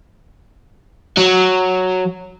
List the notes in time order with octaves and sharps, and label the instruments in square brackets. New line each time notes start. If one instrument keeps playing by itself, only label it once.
[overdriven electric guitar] F#3